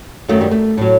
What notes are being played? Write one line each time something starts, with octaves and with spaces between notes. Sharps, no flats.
F#2 D#3 F#3 A3
G3
A3
A2 F#3